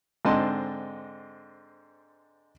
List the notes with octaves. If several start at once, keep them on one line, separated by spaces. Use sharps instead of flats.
G#2 D3 C4 D#5 A5 C6